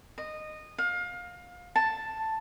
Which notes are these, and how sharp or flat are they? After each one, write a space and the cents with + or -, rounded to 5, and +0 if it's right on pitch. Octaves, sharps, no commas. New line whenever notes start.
D#5 -15
F5 +25
A5 +5